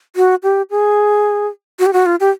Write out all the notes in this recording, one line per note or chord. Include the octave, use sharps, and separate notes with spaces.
F#4
G4
G#4
F#4
G4
F#4
F4
G4